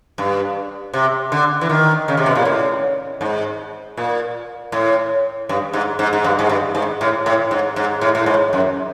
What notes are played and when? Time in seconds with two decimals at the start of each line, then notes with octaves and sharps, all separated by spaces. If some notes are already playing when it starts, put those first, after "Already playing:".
0.18 G2
0.93 C3
1.32 D3
1.61 E3
1.69 D#3
2.08 C#3
2.17 C3
2.26 B2
2.35 A#2
2.45 A2
3.21 G#2
3.97 A#2
4.72 A2
5.49 G2
5.73 G#2
5.99 G#2
6.13 G#2
6.24 G2
6.39 G#2
6.49 G2
6.75 G#2
7.01 A2
7.26 A2
7.51 G#2
7.76 G#2
8.01 A2
8.15 A2
8.26 G#2
8.53 F#2